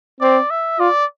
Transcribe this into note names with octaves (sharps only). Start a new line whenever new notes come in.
C4 D5
E5
F4 D5